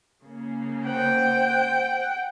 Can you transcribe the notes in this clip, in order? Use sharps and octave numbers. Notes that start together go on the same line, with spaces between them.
C#3 A#3
C5 F#5 G5